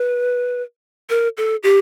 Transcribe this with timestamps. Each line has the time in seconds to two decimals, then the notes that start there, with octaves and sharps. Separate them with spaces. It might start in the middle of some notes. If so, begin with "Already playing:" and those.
Already playing: B4
1.10 A#4
1.37 A4
1.63 G4